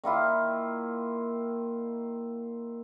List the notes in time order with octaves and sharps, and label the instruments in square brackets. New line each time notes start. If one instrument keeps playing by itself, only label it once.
[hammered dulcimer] D#3 A#3 E4 F4